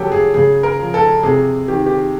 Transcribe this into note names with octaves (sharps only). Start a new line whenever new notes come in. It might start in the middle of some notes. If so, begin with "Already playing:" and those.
Already playing: C#3 F#3 G4 A4
G#4
C#3 G#4
A#4
F3
A4
C3 G#4
D#3 G4
G4